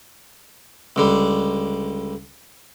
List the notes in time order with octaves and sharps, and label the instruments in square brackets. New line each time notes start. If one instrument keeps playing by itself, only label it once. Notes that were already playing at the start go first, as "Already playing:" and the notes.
[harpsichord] C#2 D3 G3